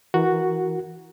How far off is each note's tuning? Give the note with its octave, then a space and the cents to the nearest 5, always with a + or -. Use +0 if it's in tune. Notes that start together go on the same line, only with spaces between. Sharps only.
E3 -5 F#4 +0 A#4 +0